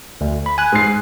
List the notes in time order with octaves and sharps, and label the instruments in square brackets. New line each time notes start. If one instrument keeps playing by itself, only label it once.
[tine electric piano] D2
B5
G#5 F#6
[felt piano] G#2 C7